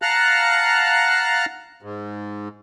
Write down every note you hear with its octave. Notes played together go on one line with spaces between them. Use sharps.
F5 F#5 A5 A#5 F6 F#6
G#2